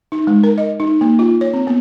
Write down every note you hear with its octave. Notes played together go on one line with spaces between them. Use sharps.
D#4
G#3
A#4
D#5
D#4
A#3
F4
C#5
C4
B3